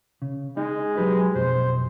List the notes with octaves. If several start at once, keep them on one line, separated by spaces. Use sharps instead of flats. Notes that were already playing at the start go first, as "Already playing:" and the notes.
C#3
G#3 D#4
F#3 G4 B4
B1 F2 C5